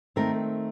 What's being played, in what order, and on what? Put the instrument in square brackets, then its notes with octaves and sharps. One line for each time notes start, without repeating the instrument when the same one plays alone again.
[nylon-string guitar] D#3 A3 C4 A#4